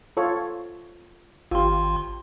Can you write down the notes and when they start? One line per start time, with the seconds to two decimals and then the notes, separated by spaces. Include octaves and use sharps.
0.17 F4 A4 C#5
1.51 G#1 F4 G4 C6